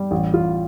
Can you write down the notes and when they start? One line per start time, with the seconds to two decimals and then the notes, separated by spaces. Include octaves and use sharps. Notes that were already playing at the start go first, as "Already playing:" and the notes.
Already playing: G3
0.11 A1
0.33 A1 F4